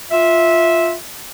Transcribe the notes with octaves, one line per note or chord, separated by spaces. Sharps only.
F4 E5